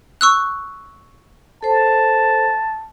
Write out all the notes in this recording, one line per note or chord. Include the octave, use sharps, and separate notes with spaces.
C#6 E6 F#6
A4 C5 A5